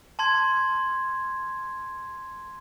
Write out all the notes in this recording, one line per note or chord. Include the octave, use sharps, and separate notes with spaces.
A5 C6 G#6